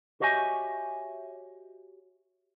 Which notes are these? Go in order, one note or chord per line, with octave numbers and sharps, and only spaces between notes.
F#4 G4 C#5 D#5 E5 G#5